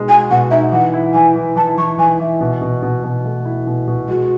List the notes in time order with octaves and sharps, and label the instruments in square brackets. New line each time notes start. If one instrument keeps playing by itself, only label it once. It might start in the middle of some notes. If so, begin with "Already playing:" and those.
Already playing: [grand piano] B2 G#3 D#4
[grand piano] F#4 [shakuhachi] G#5
[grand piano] B2 [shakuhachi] F#5
[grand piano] D#4 [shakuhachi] E5
[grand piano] E3 [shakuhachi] F#5
[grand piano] E4
[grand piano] E3 [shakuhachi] G#5
[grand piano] E3
[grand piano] E3 [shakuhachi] A5
[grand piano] E3 [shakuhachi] C#6
[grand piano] E3 [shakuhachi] G#5
[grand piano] E3 [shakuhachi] E5
[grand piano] B2
B2
B2
B2
A3
E4
B2
B2
[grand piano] G#3 [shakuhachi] F#4